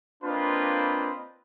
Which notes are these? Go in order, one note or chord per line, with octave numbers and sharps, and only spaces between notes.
A#3 C4 D4 F4 B4 D#5